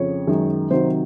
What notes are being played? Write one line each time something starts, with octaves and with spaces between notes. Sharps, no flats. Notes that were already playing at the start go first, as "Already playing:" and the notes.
Already playing: F2 C#3 C#5
F#2 D#3 G#3
C3 D#3 F#3 C5